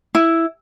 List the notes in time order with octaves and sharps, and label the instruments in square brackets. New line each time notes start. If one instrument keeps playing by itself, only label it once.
[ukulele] E4